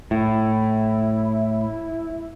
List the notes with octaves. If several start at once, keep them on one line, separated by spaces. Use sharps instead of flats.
A2 E4